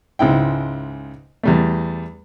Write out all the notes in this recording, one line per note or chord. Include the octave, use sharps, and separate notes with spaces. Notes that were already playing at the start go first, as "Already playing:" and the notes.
C#2 G#2 E4 G5
E2 G3 A3